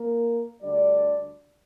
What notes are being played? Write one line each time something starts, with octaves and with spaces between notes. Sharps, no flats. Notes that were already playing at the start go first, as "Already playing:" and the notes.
Already playing: A#3 A#4
D2 D3 G3 D4 D5